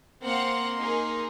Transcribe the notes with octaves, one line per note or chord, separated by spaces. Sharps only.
A#3 C4 F5 F#5 C6
D#4 G#4 A#4